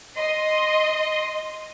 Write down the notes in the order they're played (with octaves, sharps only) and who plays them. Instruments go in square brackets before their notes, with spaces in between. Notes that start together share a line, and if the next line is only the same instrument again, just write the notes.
[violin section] D#5 C6